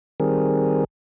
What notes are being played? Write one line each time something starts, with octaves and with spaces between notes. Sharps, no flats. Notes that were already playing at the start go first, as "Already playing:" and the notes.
D#3 G3 C4 G#4 A#4